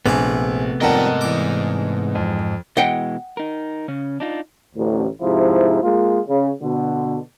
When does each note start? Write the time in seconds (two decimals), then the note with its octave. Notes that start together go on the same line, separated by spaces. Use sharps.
0.06 A#1 C3 A3 B3 G#4 D6
0.81 F2 G#2 D#3 G3 A#4 D#5 F#5 A5
1.21 E2 D6
2.15 F2
2.77 B2 E3 G#3 D#5 F#5 G5
3.37 D#4 A#4
3.88 C#3 C#4
4.20 D4 D#4 F4
4.75 A1 D2
5.22 G#2 C3 F3 E4
5.81 G#3 A#3 F4
6.27 C#3
6.62 B2 D3